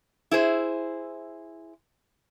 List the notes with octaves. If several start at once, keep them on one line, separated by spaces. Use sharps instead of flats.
E4 G#4 C5